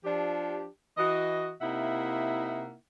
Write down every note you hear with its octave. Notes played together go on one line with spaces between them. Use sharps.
F3 D4 G4
E3 F#4 D#5
C3 A#3 D#4 E4 E5 F#5